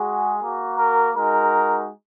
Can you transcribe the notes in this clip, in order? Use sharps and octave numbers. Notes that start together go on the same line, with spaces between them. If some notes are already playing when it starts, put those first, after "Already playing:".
Already playing: G#3 F#4 G#4
A#3 F#4
A#4
G#3 D#4 F#4 A#4